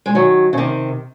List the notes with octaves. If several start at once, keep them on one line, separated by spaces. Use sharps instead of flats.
G#3
D#3 F#3
C#3
C3 D#3